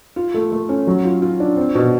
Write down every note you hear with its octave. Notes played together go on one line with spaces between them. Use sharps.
F4
A3
A3
C#4
F#3
F4
F4
D4
C4
B2